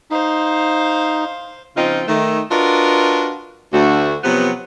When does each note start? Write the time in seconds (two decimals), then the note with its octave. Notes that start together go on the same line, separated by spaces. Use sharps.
0.11 D#4 C5 F5
1.76 C#3 F3 C4 D#4 F4
2.08 D#3 A3
2.51 D4 F4 F#4 A#4 B4 D#5
3.73 D2 A3 F#4
4.24 C3 F3 F#3 B3